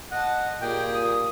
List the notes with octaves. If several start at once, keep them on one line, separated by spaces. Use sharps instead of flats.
D#5 F#5 A5
A#2 G4 G#4 G5
D#6